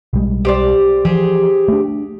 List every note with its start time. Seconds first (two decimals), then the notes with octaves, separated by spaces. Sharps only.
0.13 B1 G3 G#3
0.45 G4 C5 D5
1.05 E3 F3 G4 G#4 C5
1.68 A3 D4